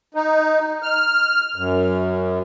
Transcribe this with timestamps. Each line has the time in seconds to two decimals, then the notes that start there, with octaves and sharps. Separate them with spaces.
0.15 D#4
0.83 F6
1.56 F#2